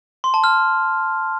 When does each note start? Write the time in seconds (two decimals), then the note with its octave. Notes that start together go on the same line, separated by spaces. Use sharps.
0.24 C6
0.34 A5
0.44 F6